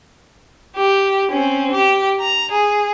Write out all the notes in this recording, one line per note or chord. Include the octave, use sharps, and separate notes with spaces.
G4
C4 C#4
G4
A#5
G#4